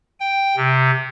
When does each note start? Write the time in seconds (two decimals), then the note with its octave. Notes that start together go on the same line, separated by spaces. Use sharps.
0.20 G5
0.57 C3